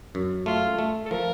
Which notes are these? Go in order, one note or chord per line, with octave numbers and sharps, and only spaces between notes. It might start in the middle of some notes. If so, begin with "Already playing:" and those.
F#2
A3 F4
A3
A4
F3 A#4